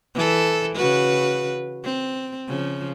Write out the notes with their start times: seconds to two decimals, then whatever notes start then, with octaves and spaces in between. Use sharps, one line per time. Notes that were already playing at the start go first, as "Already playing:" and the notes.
0.15 E3 A4
0.76 C#3 F#4 B4
1.84 C4
2.48 C#3 F3